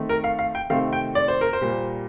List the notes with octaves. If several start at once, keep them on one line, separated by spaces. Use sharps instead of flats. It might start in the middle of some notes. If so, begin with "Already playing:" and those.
Already playing: D#3 A3 C4
A#4
F5
F5
G5
C3 D#3 A3 C4 F5
G5
D5
C5
A#4
C5
A#2 G3 A#3